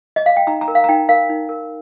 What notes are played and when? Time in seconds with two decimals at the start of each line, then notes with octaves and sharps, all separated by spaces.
0.16 D#5
0.26 F5
0.37 G5
0.47 D#4 A#5
0.61 A#5
0.68 A#4
0.75 F5
0.84 A#5
0.89 D#4 G5
1.09 A#4 F5
1.29 D#4
1.49 A#4